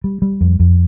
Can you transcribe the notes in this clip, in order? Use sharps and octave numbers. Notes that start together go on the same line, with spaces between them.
G3
G3
F2
F2